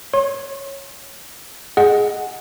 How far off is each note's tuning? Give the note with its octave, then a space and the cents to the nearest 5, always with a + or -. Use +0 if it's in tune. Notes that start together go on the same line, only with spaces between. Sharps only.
C#5 -10 C6 +40
G#4 +0 D#5 +0 F#5 +0